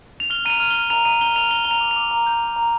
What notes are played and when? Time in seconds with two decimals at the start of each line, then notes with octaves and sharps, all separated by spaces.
0.20 F7
0.30 F6 G7
0.45 A#5 D#7
0.50 F7
0.60 F6
0.71 F6 G7
0.90 A#5 F7
1.05 A#5 D#7
1.21 F6 G7
1.36 F6 F7
1.51 A#5 G7
1.65 A#5 G7
1.71 F7
1.81 D6
1.91 F7
1.96 D6
2.11 A#5
2.26 G6
2.41 A#5
2.56 A#5